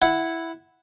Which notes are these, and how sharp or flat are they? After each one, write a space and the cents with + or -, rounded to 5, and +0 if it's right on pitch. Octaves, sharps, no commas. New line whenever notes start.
E4 +0 F#5 +0